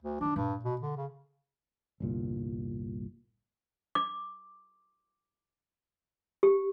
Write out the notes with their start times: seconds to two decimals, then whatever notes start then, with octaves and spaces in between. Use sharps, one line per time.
0.02 D2
0.21 F#2 D#3 D4
0.36 A1 G2 A#2
0.65 B2
0.81 D3
0.97 C#3
2.00 G1 C2 A#2
3.95 D6
6.43 G4